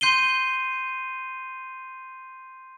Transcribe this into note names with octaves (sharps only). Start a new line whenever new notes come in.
C6 G6 C7 D#7 G7